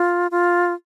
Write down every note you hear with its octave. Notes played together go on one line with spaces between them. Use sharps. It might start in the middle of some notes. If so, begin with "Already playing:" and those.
Already playing: F4
F4